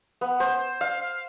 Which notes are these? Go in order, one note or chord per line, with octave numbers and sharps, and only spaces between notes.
B3
C5
F5